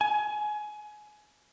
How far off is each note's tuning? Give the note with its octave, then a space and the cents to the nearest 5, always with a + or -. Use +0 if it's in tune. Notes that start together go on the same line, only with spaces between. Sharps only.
G#5 +25